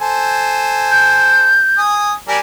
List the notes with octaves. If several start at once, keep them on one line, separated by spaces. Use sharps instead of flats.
A4 C5 G#5
G6
G#5 D#6
G3 D4 A#4 G#5